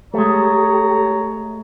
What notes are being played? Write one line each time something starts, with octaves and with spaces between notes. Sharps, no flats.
G#3 A3 G4 A4 C#5 A#5